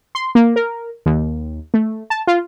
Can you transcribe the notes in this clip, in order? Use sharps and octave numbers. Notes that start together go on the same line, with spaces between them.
C6
A#3
A#4
D#2
A3
A5
F4